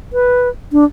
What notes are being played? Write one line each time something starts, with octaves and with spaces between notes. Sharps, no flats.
B4
D4